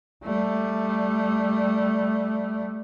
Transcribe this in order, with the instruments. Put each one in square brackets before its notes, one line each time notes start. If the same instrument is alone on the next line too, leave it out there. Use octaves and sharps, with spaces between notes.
[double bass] G3 A3